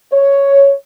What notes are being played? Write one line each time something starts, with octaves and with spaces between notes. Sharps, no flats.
C#5